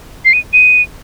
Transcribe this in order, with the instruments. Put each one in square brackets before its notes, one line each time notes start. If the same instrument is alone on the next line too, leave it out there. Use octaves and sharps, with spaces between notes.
[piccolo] C7
D#7
D#7